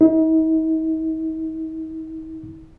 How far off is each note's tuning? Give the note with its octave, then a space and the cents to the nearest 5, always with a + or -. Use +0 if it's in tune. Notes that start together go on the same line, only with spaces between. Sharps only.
D#4 +45